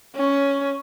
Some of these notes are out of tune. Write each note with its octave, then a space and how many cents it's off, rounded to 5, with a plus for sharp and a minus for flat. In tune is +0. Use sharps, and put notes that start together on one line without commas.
C#4 +5